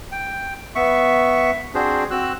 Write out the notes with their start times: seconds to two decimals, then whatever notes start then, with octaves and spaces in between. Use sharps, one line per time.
0.12 G5
0.75 B3 E5 C#6
1.75 C4 D4 F#4 G#4 C5
2.11 C4 F#4 E6 F#6